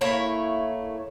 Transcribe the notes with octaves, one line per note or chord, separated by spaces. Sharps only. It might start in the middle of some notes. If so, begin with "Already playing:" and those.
A3 A#3 E4 C#5